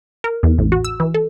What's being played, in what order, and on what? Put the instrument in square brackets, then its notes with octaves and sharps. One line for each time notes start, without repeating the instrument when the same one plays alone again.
[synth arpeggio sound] A#4
E2
A1
F#4
E6
E3
A4